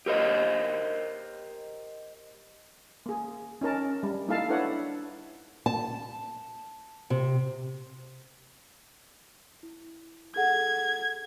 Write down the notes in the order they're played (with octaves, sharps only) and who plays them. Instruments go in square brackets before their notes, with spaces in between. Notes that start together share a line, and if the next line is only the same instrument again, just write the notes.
[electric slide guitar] G4 A#4 C5 D#5
[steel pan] A#3 G#4
C#4 D#4 A#4 A5
G3
A#3 D#4 E4 A4 F5 A5
D4 E4 A4 B4 C#5 F#5
[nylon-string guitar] A5
C3
[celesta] E4
[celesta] G#4 A4 F#5 [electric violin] G#6